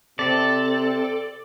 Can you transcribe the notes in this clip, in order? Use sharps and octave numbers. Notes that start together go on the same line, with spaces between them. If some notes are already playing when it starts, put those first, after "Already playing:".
C3 C4 A4 D5